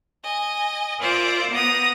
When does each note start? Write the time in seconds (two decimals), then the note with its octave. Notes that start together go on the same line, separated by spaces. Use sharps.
0.22 D#5 G#5
0.99 F4 A#4 C5 D5 E5
1.51 B3 F#5 A#5 D#6